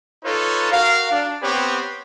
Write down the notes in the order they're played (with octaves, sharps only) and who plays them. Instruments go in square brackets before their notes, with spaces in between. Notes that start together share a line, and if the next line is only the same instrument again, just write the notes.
[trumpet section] D#4 F4 A4 B4 C#5
F#4 A#4 F5
D4
B3 C4 G4 B4 C#5